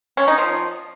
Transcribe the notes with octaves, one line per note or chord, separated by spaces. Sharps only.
C#4
D#4
F3